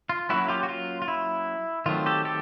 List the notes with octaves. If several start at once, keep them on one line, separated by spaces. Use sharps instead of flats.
F4
F#3 A#3 C#4 E4 F#4
F4 G4
F#4
F4
F4
E4
D#3 F#3 A3 C4 F4
G4 A4
G4 A4